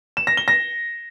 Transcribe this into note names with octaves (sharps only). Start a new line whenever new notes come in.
E7
A#6
G7
A#6